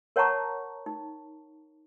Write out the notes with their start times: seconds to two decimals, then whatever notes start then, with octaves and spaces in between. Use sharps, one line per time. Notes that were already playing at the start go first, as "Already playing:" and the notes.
0.16 A#4 C#5 F#5 A5 A#5 C#6
0.86 D#4